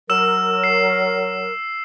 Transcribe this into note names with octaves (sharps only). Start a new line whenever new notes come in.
F#3 A#4 E6 E7
C7